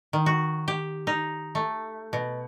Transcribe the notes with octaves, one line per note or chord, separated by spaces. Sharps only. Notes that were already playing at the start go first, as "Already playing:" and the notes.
D#3
F#4
G4
D#4
A3
B2